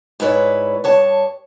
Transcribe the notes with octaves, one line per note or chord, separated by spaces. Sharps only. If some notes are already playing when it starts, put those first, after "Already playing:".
G#2 E4 B4 C#5 D5
G2 C#5 A5